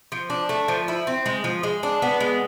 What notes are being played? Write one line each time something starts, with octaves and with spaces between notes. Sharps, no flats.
F3
D4
A3
F3
E4
C4
G#3
F3
G#3
D4
B3
G#3